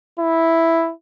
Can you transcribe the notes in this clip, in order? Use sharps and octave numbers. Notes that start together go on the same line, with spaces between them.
E4